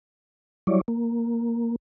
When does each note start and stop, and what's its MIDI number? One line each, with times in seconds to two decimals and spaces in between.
0.67 0.81 54
0.67 0.81 55
0.67 0.81 64
0.67 0.81 73
0.67 0.81 74
0.88 1.76 58